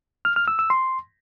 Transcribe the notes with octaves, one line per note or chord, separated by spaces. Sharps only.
F6
F6
E6
E6
C6